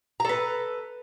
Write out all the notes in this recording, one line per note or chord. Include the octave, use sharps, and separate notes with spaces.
A4 B4 A#5